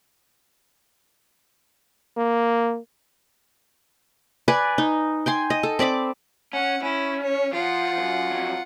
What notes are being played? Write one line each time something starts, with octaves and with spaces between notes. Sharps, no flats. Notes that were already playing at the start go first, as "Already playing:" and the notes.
A#3
B4 D5 G#5
D#4
G5 G#5 C6
D#5
A4
C4 D5 B5 D6
C#4 F#5
C#4 E4
C#5
F3 F4 F#5
F#2
F2 F#3